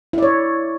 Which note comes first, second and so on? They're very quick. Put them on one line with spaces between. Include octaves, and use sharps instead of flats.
E4 D5 C#5